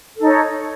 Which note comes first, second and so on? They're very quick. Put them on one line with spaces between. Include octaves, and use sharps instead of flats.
A4 D#4 C#5